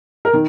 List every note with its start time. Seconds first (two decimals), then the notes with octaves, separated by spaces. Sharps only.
0.25 A#4
0.33 D#3